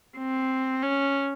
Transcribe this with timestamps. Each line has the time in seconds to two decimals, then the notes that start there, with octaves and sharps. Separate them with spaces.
0.17 C4
0.83 C#4